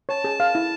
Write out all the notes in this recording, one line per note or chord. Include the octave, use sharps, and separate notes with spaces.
C#5 A5
G#4
F5
E4